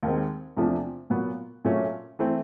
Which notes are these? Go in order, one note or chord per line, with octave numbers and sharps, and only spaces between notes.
D#2 D#3 G#3 C4
E2 C3 F3 A3 D4
A#2 F#3 B3
A#2 F#3 A3 C#4
E3 A3 C4